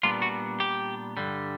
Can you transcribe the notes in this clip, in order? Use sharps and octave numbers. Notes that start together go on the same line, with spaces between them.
A#2 G3 B3 D4 F4
F#4
G4
G2 D3 G3